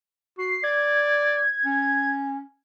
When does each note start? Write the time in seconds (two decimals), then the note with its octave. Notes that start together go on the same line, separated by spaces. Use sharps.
0.39 F#4 C7
0.64 D5 G#6
1.65 C#4